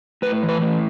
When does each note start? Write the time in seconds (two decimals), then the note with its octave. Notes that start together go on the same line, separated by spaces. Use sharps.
0.22 A2 B4
0.43 E3
0.49 B4
0.62 A2